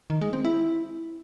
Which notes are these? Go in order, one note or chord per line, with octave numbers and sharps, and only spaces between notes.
D#3
G#3
C4
E4